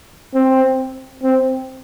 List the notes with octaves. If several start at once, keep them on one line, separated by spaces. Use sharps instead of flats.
C4
C4